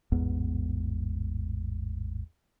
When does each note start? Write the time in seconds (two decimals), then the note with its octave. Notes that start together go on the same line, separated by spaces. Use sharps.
0.12 A1 E2 G#2 B3